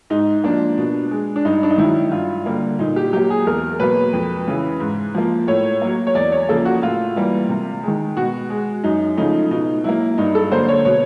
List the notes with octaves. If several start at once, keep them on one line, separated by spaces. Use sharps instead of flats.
G#2 D#4
F3 A#3 D4
B2
G#3
D4
G2 D#4
D4
D#4
D#3 F#3 E4
G2 F4
D3 G3 A#3
A#2 D#4
G4
F#3 A#3 G4
G#4
E2 A#4
B2 F#3 A#3 B4
F2
C#3 E3
G#2
F3 A#3
A2 C#5
F#3 A#3
C#5
E2 D5
C#5
C#3 F3 A#3 A4
F#4
A2 F4
E3 G3 A#3
C3
D#3 G#3
B2 F#4
G#3
F#2 D#4
C#3 F3 A3 D#4
B2 D#4
F#3 A#3 E4
G2 D#4
A4
D3 F#3 A#3 C5
C#5
B2 C#5